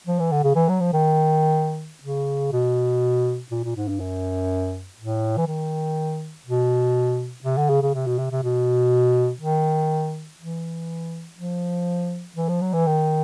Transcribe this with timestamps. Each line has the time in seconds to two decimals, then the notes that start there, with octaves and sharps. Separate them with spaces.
0.07 F3
0.20 E3
0.32 D3
0.44 C#3
0.56 E3
0.69 F#3
0.80 F3
0.93 D#3
2.03 C#3
2.52 B2
3.51 A#2
3.64 A#2
3.76 G#2
3.88 G2
4.00 F#2
4.98 A2
5.37 E3
5.48 D#3
6.47 B2
7.44 C3
7.57 D3
7.70 C#3
7.82 C#3
7.94 C3
8.06 B2
8.18 C3
8.31 C3
8.43 B2
9.41 D#3
10.40 E3
11.38 F3
12.37 E3
12.49 F3
12.61 F#3
12.73 E3
12.87 D#3